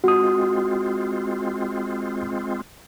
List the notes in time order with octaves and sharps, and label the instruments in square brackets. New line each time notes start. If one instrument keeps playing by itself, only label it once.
[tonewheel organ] G#3 C4 F4 [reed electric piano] F#4 D#6